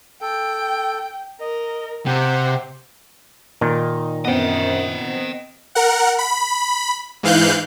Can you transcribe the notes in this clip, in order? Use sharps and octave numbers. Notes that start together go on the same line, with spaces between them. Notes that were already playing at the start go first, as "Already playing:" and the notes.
A4 G5
A#4 D#5
C3 G4 C5 F#5 G5
A#2 D#3 D#4
F#2 B3 C4 D#5 G5
A#4 F#5
B5
G#2 E3 F5 F#6 G6